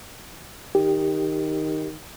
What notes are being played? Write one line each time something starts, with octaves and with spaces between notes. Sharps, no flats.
D#3 G4